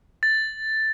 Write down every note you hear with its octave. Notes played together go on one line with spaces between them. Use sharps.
A6